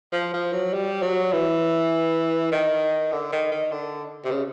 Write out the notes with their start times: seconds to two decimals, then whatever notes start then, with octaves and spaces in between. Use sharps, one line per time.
0.12 F3
0.33 F3
0.52 F#3
0.73 G3
1.02 F#3
1.32 E3
2.52 D#3
3.12 D3
3.32 D#3
3.51 D#3
3.71 D3
4.25 C3
4.31 C#3